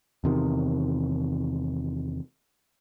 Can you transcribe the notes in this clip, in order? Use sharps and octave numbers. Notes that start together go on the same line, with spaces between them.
E2 C3 D#3